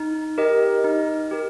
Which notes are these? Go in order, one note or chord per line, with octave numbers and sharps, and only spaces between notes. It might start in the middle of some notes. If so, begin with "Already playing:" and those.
Already playing: D#4
G4 A#4 D#5
D#4
G4 A#4